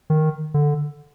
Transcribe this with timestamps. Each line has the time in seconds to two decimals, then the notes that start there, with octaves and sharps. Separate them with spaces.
0.10 D#3
0.54 D3